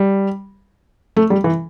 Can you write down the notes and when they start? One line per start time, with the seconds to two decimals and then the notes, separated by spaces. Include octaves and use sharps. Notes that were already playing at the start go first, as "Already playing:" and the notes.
Already playing: G3
1.17 A3
1.30 G3
1.44 E3